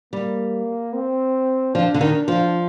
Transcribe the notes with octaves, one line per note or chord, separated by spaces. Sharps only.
G3 A#3
C4
F3 D4
D3
D#3
F3